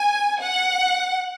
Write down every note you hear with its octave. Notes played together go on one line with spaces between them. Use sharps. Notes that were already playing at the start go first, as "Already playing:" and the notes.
Already playing: G#5
F#5